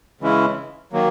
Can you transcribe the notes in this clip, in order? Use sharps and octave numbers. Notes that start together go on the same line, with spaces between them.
C#3 E3 G#3 C#4 E4
D#3 F#3 A#3